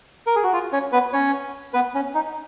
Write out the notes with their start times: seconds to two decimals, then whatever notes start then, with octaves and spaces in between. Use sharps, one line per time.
0.27 A#4
0.36 G#4
0.44 F#4
0.53 F4
0.72 C#4 C#5
0.92 B3 B4
1.13 C#4 C#5
1.74 B3 B4
1.95 C#4
2.14 D#4